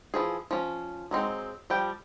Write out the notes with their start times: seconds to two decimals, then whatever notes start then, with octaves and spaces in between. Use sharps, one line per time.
0.14 E3 F3 G#4
0.51 F3 C#4
1.11 F#3 G#3 C4 D#4
1.70 F3 G3 G5